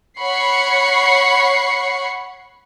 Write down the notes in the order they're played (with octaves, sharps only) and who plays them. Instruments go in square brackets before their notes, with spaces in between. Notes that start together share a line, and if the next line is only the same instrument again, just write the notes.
[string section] C#5 F#5 B5 C#6 C7